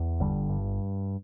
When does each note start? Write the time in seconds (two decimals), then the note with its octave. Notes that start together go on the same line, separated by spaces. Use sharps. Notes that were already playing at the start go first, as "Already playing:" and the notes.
Already playing: E2
0.20 G1 D3 G3
0.49 G2